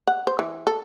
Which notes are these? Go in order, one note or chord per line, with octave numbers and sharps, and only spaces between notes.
F#5
C5
E3
A4